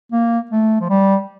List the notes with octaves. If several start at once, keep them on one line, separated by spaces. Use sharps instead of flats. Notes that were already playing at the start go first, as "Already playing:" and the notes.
A#3
A3
F3
G3